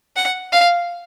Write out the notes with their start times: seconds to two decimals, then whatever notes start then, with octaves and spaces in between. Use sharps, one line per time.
0.16 F#5
0.52 F5